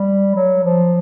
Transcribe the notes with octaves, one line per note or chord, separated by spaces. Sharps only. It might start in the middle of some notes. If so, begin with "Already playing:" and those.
Already playing: G3
F#3
F3